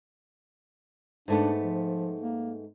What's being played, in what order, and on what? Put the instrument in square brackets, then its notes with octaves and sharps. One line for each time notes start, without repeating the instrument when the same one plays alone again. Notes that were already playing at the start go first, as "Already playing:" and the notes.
[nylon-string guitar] G#2 A3 B3 [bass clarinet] D4
[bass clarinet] F3
A#3